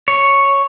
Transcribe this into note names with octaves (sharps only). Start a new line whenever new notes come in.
C#5